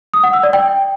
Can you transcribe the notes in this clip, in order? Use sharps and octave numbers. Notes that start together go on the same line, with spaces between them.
D#6
F#5
E6
D5
G5